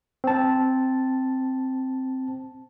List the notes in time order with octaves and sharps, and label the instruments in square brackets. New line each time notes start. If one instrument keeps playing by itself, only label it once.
[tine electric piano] C4 A5